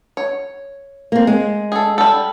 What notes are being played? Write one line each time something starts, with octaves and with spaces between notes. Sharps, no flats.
C#5
A#3 C4
G#3
G#4 A4
G3 A4